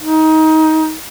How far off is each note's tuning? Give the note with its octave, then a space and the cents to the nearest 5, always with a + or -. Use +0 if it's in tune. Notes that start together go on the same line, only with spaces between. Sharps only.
D#4 +20